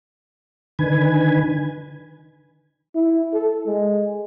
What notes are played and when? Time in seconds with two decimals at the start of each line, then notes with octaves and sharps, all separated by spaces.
0.79 D3 D#3 B4 G#5
2.95 E4
3.33 A4
3.66 G#3